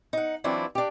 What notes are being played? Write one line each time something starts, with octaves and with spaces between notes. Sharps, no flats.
D#4 F#5
E3 F#3 C4 D4 E4 F4
D4 G4